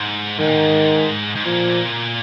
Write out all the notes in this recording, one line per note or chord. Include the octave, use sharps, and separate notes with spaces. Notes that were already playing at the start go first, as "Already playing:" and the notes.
Already playing: G#2
G#2 D#3
A#2
G#2
G#2
A#2 F3